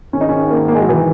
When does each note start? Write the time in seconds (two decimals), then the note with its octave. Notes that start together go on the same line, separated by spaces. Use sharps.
0.13 G#1 G#2 D#3 C#4
0.21 D#4
0.29 C#4
0.50 A#3
0.68 A#3
0.75 G#3
0.82 F#3
0.89 E3